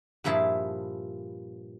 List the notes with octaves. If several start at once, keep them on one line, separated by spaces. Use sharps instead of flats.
G2 A#2 F3 E4 G#4 A5